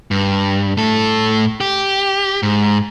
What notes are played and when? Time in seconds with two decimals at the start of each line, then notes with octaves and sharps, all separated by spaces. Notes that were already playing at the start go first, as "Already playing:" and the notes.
0.11 G2
0.77 A2 A4
1.60 G4
2.43 G#2